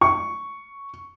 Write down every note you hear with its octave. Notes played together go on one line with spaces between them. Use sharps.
C#6